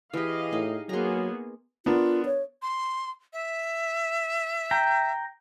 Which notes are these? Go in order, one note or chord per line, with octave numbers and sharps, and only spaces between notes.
E3 G4 G#4 D#5 F5
A2 D#4
F#3 A#3 B3 G#4 A#5 C6
B3 D4 F4 A#4
C#5
C6
E5
G5 A#5